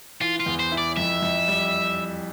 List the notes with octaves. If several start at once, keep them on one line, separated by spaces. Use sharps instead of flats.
E3 F4
F4
E2
C5
E4
D5
F2 E5
F2
G3